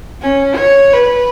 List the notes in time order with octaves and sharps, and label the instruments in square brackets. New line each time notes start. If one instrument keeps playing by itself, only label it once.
[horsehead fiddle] C#4
C#5
B4